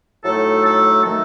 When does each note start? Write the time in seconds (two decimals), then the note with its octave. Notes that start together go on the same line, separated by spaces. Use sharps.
0.24 A2 F#3 A3 D#4 A4
0.65 A4
1.05 D#3 F#3 A3 A4